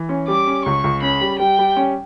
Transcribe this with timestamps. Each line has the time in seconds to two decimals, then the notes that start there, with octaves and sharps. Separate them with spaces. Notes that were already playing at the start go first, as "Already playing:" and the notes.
Already playing: E3
0.09 C#4
0.28 G3 D6
0.47 C#4
0.65 C#2 C#6
0.84 C#2
1.02 C#4 B5
1.21 G3
1.39 G3 G5
1.59 G3
1.77 C#4